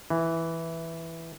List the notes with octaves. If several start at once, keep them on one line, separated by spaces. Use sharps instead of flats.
E3